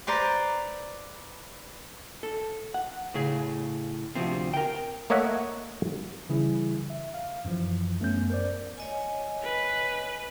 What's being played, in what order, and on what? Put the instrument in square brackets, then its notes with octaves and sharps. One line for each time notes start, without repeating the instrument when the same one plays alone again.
[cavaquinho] B4 C5 D5 A#5
[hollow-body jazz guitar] A4
F#5
A2 C#3 G#4
D2 C3 F3 C4
A#4 G5
[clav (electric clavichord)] A3 A#3 C#5 D#5 E5 F#5
[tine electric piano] C#3 E3 G3 E4 G#4
E5
F5
F#2 E3 F3
F#2 A3 B3 C#4 G6
A#4 C5 D5
[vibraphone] C#5 D#5 G#5
[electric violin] B4